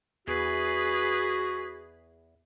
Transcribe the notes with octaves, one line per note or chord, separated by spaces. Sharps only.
E2 F#4 G#4 B4